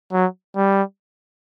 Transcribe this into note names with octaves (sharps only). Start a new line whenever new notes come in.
F#3
G3